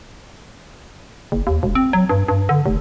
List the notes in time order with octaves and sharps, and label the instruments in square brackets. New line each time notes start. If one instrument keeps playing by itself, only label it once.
[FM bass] F#1
D#2
E1
C4
F#3
G2
G2
D3
F1